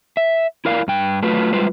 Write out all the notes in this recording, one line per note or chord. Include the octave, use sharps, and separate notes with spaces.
E5
E4 A#4 D5 F5
G2 G5
F#3 A3 F4 B4
G3 G#3 F4 B4 C5